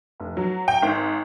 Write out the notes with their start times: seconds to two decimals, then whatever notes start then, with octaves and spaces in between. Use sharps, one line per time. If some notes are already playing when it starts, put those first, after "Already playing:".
0.20 F1
0.37 F#3
0.68 G5
0.82 G#1